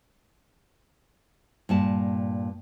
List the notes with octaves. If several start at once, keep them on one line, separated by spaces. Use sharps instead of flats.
G2 A#2 A5